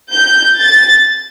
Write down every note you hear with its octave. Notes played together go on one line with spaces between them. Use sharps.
G6
A6